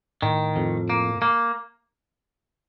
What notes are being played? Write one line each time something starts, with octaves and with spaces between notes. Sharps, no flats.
A2 D#3
F2
A#3
A#3